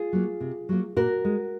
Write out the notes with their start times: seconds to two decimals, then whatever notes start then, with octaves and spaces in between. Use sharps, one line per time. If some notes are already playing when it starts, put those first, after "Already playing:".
Already playing: F4 G#4
0.13 F#3 A#3
0.40 C3
0.69 F#3 A#3
0.96 A#2 F#4 A#4
1.25 G#3